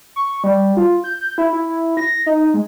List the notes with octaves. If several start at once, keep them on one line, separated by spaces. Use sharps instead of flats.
C#6
G3
F4
G6
E4
E4
A#6
D#4
G#3